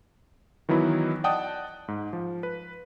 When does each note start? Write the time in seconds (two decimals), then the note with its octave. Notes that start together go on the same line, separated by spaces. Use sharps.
0.69 D#3 E3 F#3 B3 E4
1.24 D5 D#5 F#5 G5 A5 D#6
1.88 G#2
2.13 F3
2.43 B4